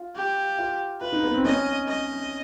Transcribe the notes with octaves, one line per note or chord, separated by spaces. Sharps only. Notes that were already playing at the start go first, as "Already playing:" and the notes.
Already playing: F4
G4
F4
F4 B4
D#4
B3
C4
C#4 D#5
D#5